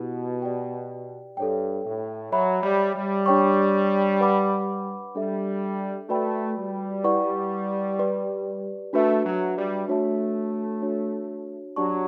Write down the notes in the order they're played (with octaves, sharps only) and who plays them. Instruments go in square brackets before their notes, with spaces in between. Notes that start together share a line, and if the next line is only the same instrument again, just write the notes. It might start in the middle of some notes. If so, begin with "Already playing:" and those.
Already playing: [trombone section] B2 [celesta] E4 G4 B4 F#5
[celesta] G4 D5 G5
[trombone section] G2 [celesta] A4 C#5 G5
[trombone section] A2
[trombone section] F#3 [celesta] C#5 E5 B5
[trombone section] G3
G3
[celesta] D4 G4 C#5 G5 C#6
B4 F#5 B5 D6
[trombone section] G3 [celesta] D4 A4 E5
[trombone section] A3 [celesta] F#4 B4 D5 G5 B5
[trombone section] G3
[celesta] E4 B4 D5 F#5 C#6
G4 B4 D5
[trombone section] A3 [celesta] D4 F#4 B4 E5
[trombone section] F#3
G3
[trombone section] A3 [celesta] D4 F#4 C#5 E5 A5
[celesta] D4 F#4 C#5
[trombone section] F#3 [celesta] D4 G4 D5 A5 C#6